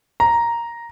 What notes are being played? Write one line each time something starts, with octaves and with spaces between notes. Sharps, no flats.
A#5